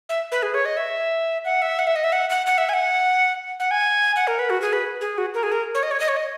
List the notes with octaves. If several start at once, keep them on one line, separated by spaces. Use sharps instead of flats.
E5
B4
G#4
C#5
D#5
E5
F#5
E5
F#5
E5
D#5
E5
F#5
F#5
F#5
E5
G#5
F#5
F#5
G#5
F#5
A#4
B4
F#4
G#4
B4
G#4
F#4
A#4
G#4
A#4
C#5
D#5
C#5
D#5
C#5
D#5